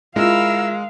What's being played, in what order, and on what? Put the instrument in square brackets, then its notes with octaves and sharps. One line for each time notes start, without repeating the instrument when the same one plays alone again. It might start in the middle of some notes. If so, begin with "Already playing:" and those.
[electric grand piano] G#3 [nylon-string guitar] E4 F4 [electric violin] A#4 E6 [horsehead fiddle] F5